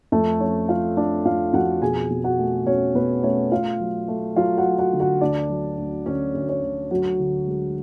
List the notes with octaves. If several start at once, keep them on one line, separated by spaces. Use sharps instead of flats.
F2 A3 A4
F3 C#4 C#5
F3 F4 F5
A3 D4 D5
F2 F4 F5
F2 F#4 F#5
B2 G#4 G#5
B2
F#4 F#5
A3
B2 C#4 C#5
B2 B3 B4
A3 C#4 C#5
A3 F4 F5
F#3
A3
F#3 F4 F5
F#4 F#5
F#3
F#4 F#5
D3
F#4 F#5
D2 D4 D5
F#3
D2
D2 C#4 C#5
D2
C#4 C#5
D2
D2 F#3 F#4
D3
G#3